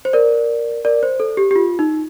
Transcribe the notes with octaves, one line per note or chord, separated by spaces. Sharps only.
C5
A#4 D5
A#4 D5
C5
A4
G4
G4
F4
D#4